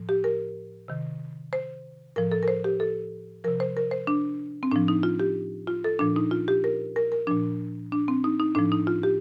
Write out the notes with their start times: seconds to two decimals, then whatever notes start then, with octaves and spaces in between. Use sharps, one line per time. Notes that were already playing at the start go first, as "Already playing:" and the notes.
Already playing: A2 F3
0.09 G4
0.24 A#4
0.88 C3 D#3
1.53 C5
2.16 A2 F3 A#4
2.32 A4
2.43 A#4
2.48 C5
2.64 G4
2.80 A4
3.44 C3 F3 A#4
3.60 C5
3.77 A#4
3.91 C5
4.07 D4
4.63 C4
4.71 A2 F3 D4
4.88 D#4
5.03 F4
5.20 G4
5.67 F4
5.84 A4
5.99 A#2 F3 D4
6.16 D#4
6.31 F4
6.48 G4
6.64 A#4
6.96 A#4
7.12 A#4
7.27 A#2 F3 D4
7.92 D4
8.08 C4
8.24 D#4
8.40 D#4
8.55 A2 F3 D4
8.72 D#4
8.87 F4
9.03 G4